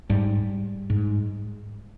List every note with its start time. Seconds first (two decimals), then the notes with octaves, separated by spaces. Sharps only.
0.10 G#2 G3
0.90 G#2